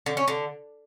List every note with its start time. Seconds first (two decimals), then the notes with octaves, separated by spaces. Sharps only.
0.06 D3
0.17 C#4
0.28 D3